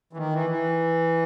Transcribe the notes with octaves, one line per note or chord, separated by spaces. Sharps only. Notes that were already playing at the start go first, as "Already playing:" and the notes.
E3
D#3
E3
E3